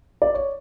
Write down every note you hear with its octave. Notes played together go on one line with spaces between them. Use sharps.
D5
C#5